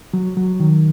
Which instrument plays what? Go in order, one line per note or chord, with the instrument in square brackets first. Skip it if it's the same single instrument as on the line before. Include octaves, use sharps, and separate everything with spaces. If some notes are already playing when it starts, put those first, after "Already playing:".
[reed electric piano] F#3
F#3
D#3